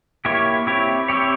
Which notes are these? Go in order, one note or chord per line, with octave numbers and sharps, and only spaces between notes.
A#3 E4 G4 C#5
C4 E4 G4 C#5
C4 E4 G4 C#5